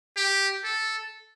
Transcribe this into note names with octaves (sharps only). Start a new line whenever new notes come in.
G4
A4